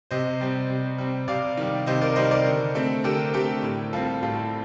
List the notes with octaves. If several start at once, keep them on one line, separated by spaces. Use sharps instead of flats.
C3 C5 D#5
G3 C4
C3
G3 C4
C3 D5 F5
D#3 G3
C3 C5 D#5
A#4 D5
D#3 G3 C5 D#5
A#4 D5
D3
A3 C4
D3 G4 A#4
A3 C4 G4
A2
G3 C4 F4 A4
A2 F4 A4